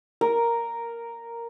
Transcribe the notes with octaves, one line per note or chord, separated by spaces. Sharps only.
A#4